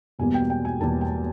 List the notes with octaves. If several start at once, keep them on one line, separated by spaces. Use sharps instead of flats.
E1 E2 B2 G3 A#3 G#5
G5
G5
G#5
E1 E2 B2 G3 A#3 A5
G5